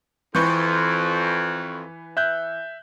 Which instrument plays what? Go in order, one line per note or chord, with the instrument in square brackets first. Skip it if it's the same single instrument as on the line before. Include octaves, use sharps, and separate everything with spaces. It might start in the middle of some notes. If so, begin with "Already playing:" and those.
[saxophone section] F2 [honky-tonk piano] E3 B4 [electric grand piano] C#6 G6
[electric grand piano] E5 F#6 G6